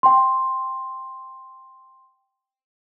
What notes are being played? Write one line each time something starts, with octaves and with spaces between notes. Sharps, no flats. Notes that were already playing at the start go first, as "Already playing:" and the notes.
G5 C6